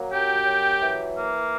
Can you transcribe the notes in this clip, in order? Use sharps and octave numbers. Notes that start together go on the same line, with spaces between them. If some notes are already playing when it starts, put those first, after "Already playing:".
Already playing: F#3 A#3
F#2 G4 G5
F#3
E3
A#3